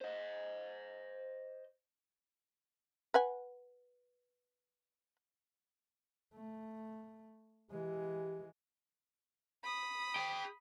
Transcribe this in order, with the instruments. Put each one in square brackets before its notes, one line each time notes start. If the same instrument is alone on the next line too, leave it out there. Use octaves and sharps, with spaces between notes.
[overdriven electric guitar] C5 D#5
[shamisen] B4 F#5 G#5
[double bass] A3
[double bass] E3 G#3 [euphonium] G4
[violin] B5 D#6
[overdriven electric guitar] G#4 G5